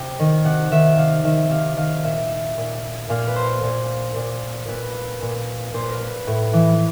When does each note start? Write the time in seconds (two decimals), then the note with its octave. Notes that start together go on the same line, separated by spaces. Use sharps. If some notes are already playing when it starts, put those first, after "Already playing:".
Already playing: C3 G5
0.19 D#3
0.45 C3 F#5
0.72 D#3 E5
0.98 C3 F5
1.25 D#3 E5
1.51 C3 F5
1.77 D#3 F5
2.04 A#2 E5
2.57 A#2
3.09 A#2 F5
3.27 B4
3.36 C5
3.63 A#2
4.16 A#2
4.68 A#2 B4
5.22 A#2
5.73 A#2 C5
5.83 B4
5.91 A#4
6.00 B4
6.27 A2
6.53 E3